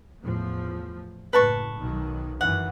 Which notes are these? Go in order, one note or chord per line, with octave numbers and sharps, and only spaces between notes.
E2 A2 F3
F#1 A2 B4 A5 C#6
B1 D#3 F#3
F#2 D#3 E3 F#5